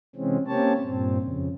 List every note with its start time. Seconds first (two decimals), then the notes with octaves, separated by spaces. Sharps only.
0.16 C3 E3 G#3 C4 C#4
0.47 A#3 C4 C#4 G4 C#5 A5
0.82 G2 A#2 C4
1.20 F2 C#3